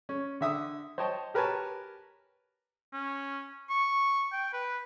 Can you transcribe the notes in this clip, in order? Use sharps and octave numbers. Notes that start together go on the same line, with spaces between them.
C#4
D3 E5 D#6
C5 C#5 D#5 G5 A5
G4 A#4 B4 C#5 G#5 A5
C#4
C#6
G5
B4